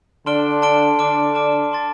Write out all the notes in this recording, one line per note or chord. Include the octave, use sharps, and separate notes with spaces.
D3 D4 A5 C6 F6 D7 G7
A5 C6 F6 D7 G7
D3 D4 A5 D6 F6 D7
A5 D6 F6 D7
A5 C6 A6